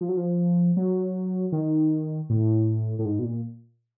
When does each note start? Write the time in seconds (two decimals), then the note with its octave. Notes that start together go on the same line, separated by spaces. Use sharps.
0.01 F3
0.09 F#3
0.17 F3
0.77 F#3
1.52 D#3
2.30 A2
2.99 A2
3.05 G#2
3.19 B2
3.24 A#2